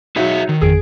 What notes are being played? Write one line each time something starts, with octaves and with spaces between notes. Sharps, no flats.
F#3 D#4 F#4 G#4 E5 C#7
D#3
G#1 F2 G#4 D7